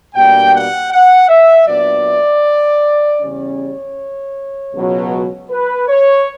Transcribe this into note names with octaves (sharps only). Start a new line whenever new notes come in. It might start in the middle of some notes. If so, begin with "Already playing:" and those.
B2 G3 A#3 D4 G5
F#5
F#5
E5
A#2 F#3 B3 D4 D5
E2 C#3 G3 C#4 C#5
C#2 B2 F#3
B4
C#5